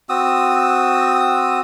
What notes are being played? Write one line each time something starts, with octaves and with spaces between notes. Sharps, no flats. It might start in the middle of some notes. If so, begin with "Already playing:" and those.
C4 F#4 D#6 E6